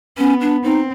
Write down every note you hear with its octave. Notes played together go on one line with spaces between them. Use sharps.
B3 C#4
D4
C4 D#4